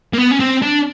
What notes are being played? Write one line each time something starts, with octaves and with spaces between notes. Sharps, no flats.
A#3
B3
C#4
C4
D4